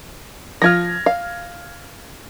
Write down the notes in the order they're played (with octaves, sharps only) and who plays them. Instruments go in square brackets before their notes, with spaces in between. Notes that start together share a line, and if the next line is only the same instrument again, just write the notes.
[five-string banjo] F3 F4 [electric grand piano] F6 G#6 A#6
[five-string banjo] F5